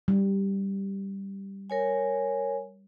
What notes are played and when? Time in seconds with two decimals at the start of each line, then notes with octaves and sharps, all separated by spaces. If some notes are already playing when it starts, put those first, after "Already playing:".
0.08 G3
1.70 A#4 C#5 G#5